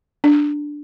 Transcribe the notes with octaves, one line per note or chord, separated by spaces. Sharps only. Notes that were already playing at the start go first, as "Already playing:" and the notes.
D4